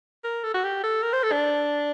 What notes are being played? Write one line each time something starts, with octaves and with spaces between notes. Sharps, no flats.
A#4
A4
F#4
G4
A4
A#4
C5
A4
D4